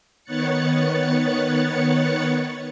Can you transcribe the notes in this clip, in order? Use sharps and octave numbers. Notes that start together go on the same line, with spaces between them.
D#3 B3 C#5 F#6 A6 C#7